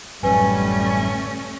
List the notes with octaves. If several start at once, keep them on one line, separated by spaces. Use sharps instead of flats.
A1 F#2 G3 A3 C#4 B4 G#5